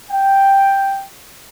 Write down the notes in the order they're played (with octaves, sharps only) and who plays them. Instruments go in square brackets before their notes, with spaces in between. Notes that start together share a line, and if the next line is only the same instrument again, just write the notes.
[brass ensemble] G5